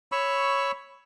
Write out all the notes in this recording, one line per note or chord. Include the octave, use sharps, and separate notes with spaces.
C#5 B5 C#6 E6